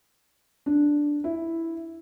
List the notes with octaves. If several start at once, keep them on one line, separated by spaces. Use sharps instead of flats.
D4
E4